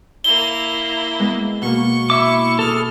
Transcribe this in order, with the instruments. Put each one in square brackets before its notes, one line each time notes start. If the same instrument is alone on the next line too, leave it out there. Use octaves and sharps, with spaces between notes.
[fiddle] A#3 E4 [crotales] G7
[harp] G#3 B3
[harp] B2 A#3 [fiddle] C#6
[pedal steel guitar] E4 E5 D6
[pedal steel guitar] G#4 A4 [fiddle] F6